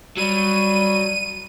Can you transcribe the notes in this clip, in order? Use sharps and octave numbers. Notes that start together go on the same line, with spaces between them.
F#3 G3 D#7